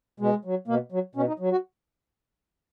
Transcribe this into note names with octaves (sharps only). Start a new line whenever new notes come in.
B2 G#3
F#3
B2 A#3
F#3
B2 C#4
D#4
F#3
F#4